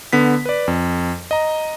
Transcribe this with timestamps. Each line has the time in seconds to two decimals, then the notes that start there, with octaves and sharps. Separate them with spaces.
0.13 D3 B3 B6
0.46 B4 D5
0.68 F2
1.31 D#5 A#5